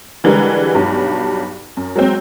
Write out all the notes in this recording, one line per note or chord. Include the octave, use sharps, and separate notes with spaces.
D3 E3 G3 G#3 A#4 B4
B1 G2 F#3
F#2
F#3 G#3 C4